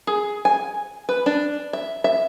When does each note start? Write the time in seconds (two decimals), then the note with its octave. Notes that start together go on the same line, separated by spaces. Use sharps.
0.07 G#4
0.45 G#5
1.09 B4
1.26 D4
1.73 E5
2.04 E5